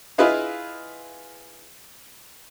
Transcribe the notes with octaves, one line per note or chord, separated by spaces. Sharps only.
E4 F4 G#4 B4 D#5 F5